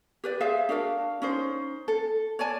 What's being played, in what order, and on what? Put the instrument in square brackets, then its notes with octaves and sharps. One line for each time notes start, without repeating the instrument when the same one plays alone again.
[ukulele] G4 B4 D5
G#4 C5 E5 F5
D4 F#4 A#4 F5
C#4 D#4 C5
A4
C#5 D5 G#5 A5